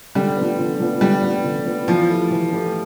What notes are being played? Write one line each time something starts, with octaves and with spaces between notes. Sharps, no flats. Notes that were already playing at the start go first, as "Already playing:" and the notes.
D3 G3
F3 B3
D3
F3 B3
D3 G3
F3 B3
D3
F3 B3
E3 F3
A3 E4 G4
E3
A3 E4 G4